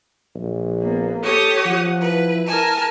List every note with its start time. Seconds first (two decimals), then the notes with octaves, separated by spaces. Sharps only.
0.35 A#1
0.82 A#3 B3
1.22 G4 A4 C#5 D#6
1.66 F3 F#5
2.01 E4 B4
2.47 A#4 G#5 A5